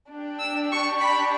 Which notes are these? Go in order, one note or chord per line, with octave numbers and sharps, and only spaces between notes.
D4 G4
E6
C#6
B5